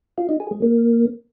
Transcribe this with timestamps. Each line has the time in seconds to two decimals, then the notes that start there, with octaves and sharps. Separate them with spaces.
0.18 F4
0.29 D#4
0.40 G#4
0.51 G#3
0.62 A#3